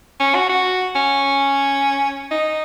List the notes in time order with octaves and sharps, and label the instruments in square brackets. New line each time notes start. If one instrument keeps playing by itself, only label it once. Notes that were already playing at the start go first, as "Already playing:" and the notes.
[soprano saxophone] C#4
F#4
F#4
C#4
D#4